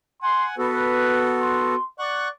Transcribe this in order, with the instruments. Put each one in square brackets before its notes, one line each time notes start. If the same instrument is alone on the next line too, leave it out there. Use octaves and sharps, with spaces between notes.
[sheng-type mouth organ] F#5 G#5 [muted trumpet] C6
[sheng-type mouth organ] B3 F#4 A4 [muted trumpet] B4
[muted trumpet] C6
[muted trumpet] D5 [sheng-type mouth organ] F#5 C#6 F#6